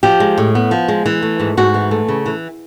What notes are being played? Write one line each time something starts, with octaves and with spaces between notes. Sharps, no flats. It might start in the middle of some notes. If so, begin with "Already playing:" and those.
F3 G4
G#3
A2
B3
F3
G#3
E3
A3
G#2
G#2 F#4
E3
A3
C#3
E3